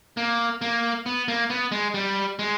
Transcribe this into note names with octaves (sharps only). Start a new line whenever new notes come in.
A#3
A#3
B3
A#3
B3
G#3
G3
G#3